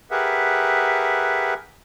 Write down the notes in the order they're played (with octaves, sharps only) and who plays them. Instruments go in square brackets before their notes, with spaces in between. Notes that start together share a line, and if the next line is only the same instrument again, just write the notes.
[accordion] G4 G#4 A#4 B4 E5 F#5